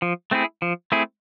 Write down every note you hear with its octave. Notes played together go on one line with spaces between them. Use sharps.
F3
A3 C4 E4 G#4
F3
A3 C4 E4 G#4